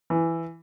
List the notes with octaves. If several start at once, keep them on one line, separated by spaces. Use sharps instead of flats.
E3